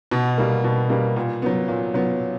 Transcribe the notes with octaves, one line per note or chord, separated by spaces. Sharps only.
B2
G3 A#3
B2
G3 A#3
A#2
F#3 B3
A#2
F#3 B3